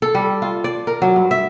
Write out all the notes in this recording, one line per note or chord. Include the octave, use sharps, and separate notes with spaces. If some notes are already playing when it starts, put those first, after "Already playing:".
A4
G3
F4
D5
A#4
F#3
G2
E5